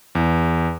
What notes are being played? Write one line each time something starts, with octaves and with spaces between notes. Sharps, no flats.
E2